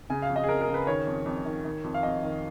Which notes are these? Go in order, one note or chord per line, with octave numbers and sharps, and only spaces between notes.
C#3 G#5
F5
F2
D#5
G#4
F2 A#4
A#4
C#3
B4
D#3 C#5
F2
F2
D#3
D#3
F2
F5
F2 D#5
D#3